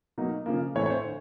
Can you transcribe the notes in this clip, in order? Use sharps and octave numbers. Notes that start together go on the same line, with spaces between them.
B2 F#3 A#3 D#4
C#3 F3 A#3
A2 E3 A3 C4 C#5
C#5
C5
D3